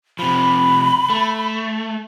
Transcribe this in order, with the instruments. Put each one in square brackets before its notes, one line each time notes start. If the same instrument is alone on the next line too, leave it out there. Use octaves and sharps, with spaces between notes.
[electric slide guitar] C3 F3 [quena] B5
[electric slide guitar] A3